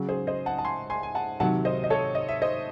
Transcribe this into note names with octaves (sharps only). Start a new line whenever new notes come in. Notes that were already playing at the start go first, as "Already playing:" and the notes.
Already playing: C#3 F#3
G#4 C5
C5 D#5
F#5 A5
A5
G#5 C6
G#5 C6
G#5
F#5 A5
C3 D#3 F#3 F#5 A5
C5 D#5
D#5
A4 C#5
D#5
E5
C5 D#5